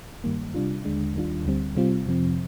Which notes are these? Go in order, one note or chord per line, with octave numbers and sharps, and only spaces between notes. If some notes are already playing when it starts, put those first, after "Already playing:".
G2 D#3 G3 A#3
C3 G3 D4 F4
D#2 D3 G#3 D4
D#2 D#3 G3 D4 F4
D2 D3 G3 C4
C3 G3 C4 F4
F2 C3 F3 C4